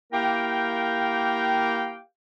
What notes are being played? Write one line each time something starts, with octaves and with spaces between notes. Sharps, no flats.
A#3 E4 G4 A#4 F5 G5